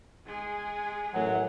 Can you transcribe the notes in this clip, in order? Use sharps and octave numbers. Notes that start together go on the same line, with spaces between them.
G#3 G#4
A1 F#2 F#3 F#5